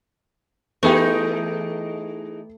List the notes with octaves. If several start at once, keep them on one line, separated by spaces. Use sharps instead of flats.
E3 A3 B3 D#4 G4 G#4